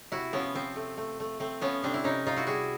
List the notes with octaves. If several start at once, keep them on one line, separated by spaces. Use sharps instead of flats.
C3 E4 F#4
F3 B3 C#4
F3 C4
A3
A3
A3
A3 C4
F3 B3 C#4
C3 C4 D4
E4
C3 C#4 D#4
C3 D#4 F4
E4 F#4
G3 F#4 G#4